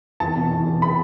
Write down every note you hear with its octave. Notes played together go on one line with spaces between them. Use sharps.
E2 A5
B2
E2
B2
B5